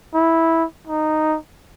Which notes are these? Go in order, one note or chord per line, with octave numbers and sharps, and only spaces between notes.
E4
D#4